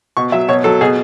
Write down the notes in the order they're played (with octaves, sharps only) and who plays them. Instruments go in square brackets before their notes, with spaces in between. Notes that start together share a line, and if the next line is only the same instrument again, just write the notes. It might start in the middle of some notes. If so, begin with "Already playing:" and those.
[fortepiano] B2 C#6
F#3 E5
B2 C#5
F#3 A4
B2 G#4